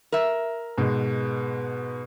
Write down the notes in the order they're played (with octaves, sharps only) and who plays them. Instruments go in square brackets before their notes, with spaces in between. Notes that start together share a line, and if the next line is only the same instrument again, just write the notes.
[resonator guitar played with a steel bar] A#4 E5
[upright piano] G#2 B2 G#3